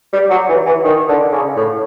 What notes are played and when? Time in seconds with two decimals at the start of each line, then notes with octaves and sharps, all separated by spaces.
0.13 G3
0.30 F#3
0.49 E3
0.66 E3
0.84 D#3
1.08 D3
1.32 C#3
1.56 A2